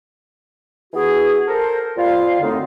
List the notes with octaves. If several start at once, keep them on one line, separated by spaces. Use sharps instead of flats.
E3 B3 F#4 G#4
A4 A#4 C5
F2 G3 F4 F5
F#2 A2 D3 A3 C4 D#4